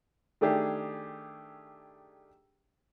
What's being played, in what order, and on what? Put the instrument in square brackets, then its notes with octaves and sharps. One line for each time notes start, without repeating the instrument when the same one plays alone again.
[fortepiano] D#3 A3 D4 G4 G#4